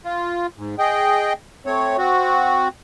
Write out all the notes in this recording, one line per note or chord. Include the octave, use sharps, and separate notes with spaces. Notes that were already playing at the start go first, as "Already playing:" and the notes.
F4
G#2
G#4 D#5 G5
A3 C4 C#5
C4 F#4